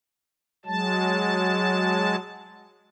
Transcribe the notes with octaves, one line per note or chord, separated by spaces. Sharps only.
F#3 G#3 A5